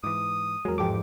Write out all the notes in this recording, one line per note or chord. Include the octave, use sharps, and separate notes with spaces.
G#2 E3 D6 D#6 D#7
E2 F#3 G#3 A#4
A1 G#2 F3 G4 A4 D6